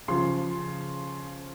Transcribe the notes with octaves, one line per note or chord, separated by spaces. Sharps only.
C#3 F3 C6